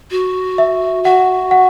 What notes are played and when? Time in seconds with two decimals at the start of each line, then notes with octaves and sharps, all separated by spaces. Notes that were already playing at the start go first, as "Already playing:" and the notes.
0.11 F#4
0.58 E5
1.04 F#4 F#5
1.51 F#5